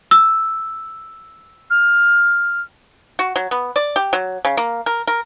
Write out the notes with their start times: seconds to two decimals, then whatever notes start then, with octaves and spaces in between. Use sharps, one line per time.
0.11 E6
1.70 F6
3.19 F#4
3.36 F#3
3.51 B3
3.76 D5
3.96 G4
4.13 F#3
4.45 C#3
4.57 A#3
4.86 A#4
5.07 A#4